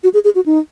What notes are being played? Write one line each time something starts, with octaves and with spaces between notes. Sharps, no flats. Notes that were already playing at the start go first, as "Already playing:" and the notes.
F#4
G#4
G#4
F#4
D#4